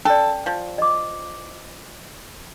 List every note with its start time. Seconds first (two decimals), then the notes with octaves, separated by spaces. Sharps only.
0.05 C#4 A4 D5
0.46 F3
0.78 D#5 D6